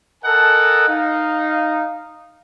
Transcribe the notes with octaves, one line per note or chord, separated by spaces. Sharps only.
A4 A#4 D#5 F#5 G#5 A5
D#4 F5